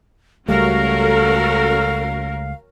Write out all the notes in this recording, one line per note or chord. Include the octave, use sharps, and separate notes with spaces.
C#2 G3 A3 C#4 F#4 A4 A#4 F5